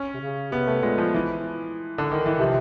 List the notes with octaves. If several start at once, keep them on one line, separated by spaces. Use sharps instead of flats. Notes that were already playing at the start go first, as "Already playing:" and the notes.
Already playing: C#4
C3
C#3
C3 B3
A3
A#2 G#3
F3
E3
D3
D#3
E3
C3 F3